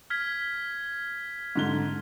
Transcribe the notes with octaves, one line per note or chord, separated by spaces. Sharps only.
F6 G#6 B6
G#2 D3 G7